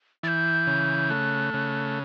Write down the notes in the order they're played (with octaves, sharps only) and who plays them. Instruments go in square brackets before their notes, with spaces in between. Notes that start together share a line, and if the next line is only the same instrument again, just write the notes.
[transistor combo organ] E3 [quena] A6
[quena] G6
[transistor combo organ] C#3
[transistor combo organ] A3 [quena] F#6
[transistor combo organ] C#3